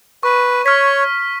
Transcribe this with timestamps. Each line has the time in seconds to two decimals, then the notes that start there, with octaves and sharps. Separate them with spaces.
0.23 B4 C#6
0.65 C#5 F6 B6